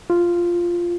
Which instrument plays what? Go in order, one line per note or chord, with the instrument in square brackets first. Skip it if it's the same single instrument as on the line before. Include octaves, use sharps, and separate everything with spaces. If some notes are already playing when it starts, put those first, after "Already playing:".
[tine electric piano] F4